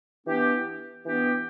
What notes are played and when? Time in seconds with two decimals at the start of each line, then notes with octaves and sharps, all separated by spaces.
0.25 E3 B3 D4 G4
1.05 E3 B3 D4 G4